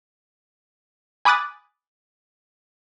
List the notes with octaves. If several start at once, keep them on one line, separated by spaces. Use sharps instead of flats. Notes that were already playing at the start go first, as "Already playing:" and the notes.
G#5 B5 D6 D#6 F#6 A6